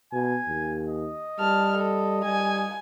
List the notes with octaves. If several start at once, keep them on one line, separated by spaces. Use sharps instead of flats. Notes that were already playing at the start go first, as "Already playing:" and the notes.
B2 G#5
D#2
D#5
G3 A5 F6
A4
G3 G#5